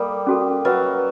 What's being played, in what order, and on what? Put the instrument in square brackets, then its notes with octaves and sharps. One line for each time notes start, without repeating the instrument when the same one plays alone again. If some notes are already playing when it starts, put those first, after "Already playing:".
Already playing: [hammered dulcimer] G3 A#3 [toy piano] A4
[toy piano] C#4 F#4 A4
[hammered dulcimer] F#3 [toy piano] B4 D#5 F#5 B5